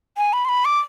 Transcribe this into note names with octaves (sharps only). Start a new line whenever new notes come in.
G#5
B5
C6
B5
D6